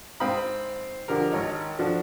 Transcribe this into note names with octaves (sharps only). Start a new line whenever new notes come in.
G#2 C4 F5 G5 B5 D#6
D3 F3 G4 A#4
G#1 C#5 D#5
F3 D4 F#4 A4